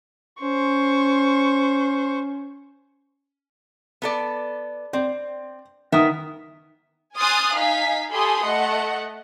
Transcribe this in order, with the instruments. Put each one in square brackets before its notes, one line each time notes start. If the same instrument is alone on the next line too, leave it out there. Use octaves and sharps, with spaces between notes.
[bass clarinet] C#4 [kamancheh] C5 C#6
[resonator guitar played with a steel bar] B3 A4 D5
[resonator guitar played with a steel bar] C4 [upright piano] D5
[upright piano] D#3 D#6 [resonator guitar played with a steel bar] B3 A#4 E5
[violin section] G#5 C6 D#6 F6 F#6 A6
D#4 F5 G#5 B6
G4 A4 G#5 B5 C6 D#6
A3 D#5 F#5